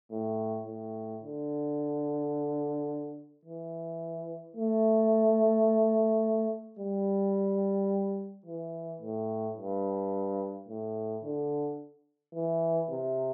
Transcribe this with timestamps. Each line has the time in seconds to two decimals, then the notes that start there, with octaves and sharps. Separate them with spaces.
0.11 A2
0.67 A2
1.23 D3
3.45 E3
4.57 A3
6.79 G3
8.46 E3
9.02 A2
9.57 G2
10.68 A2
11.24 D3
12.35 E3
12.91 C3